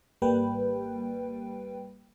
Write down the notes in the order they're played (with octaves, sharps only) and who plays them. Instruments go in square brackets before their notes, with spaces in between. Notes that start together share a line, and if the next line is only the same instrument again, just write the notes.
[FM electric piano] G#1 G3 A#3 B4 G5